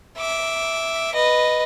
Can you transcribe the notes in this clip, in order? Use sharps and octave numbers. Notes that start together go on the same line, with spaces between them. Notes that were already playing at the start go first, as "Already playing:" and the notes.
E5 D6
B4 D#5